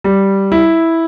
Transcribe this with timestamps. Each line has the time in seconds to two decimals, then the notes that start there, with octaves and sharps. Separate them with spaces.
0.04 G3
0.52 E4